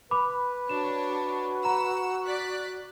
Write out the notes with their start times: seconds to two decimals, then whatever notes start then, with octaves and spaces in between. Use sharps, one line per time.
0.11 B4 B5 D6
0.69 D4 F#4 C#5 E7
1.65 F#5 A#5 E6
2.26 D5 F#6 B6